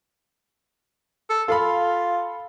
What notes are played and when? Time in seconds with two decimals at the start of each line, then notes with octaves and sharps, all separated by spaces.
1.30 A4
1.48 F4 A4 F5 B5